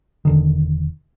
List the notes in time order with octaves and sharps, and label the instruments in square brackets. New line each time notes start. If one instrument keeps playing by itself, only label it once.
[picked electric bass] E1 D3 D#3